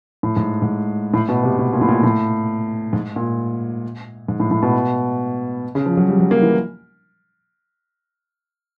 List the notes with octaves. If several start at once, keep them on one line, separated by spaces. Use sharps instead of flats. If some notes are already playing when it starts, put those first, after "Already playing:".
A2
G#2
G#2
A2
B2
C3
B2
A#2
A2
A#2
A2
G#2
A#2
G#2
A2
A2
B2
C#3
F3
F#3
G3
F#3
A#3
E3